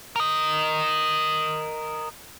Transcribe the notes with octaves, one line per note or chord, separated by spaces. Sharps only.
A#4 D#5